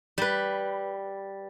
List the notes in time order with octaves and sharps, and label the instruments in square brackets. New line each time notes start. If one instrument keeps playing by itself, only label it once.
[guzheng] G3 B4